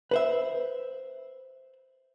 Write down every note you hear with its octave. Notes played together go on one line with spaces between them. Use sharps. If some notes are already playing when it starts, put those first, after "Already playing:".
B4 C5 E5